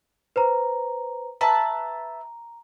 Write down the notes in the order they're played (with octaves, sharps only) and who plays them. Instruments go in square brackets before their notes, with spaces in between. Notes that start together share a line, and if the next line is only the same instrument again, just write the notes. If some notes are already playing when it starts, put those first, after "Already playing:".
[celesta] B4 C5 A#5
[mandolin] B4 E5 A5 [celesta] A#5